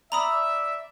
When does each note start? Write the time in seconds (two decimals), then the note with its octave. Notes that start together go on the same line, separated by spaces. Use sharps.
0.12 D5 E5 A#5 B5 D#6